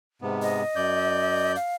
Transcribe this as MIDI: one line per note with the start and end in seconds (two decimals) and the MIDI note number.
0.22 0.63 44
0.22 0.63 48
0.22 0.63 59
0.42 1.52 75
0.76 1.56 42
0.76 1.56 74
0.76 1.56 91
1.56 1.75 77